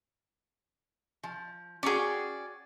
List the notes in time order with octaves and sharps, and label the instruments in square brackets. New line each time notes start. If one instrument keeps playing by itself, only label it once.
[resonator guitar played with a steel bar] F3
[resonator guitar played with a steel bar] C#4 F#4 G5 [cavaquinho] G#4 D5